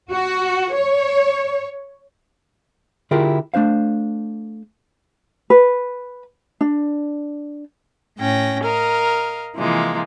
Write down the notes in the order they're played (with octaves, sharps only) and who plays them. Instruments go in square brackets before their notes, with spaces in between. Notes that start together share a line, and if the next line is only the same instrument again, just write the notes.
[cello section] F#4
C#5
[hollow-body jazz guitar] D3 E4 F4 G4 G#4 A#4
A3 D4 C5 F5
[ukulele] B4
D4
[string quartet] A2 C#4 G5 A#6
A#4 D#5 F5
C3 E3 F3 G#3 A#3